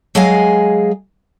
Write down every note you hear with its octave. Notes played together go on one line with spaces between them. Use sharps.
F#3 G#3 G#4 D#5 F5 G#5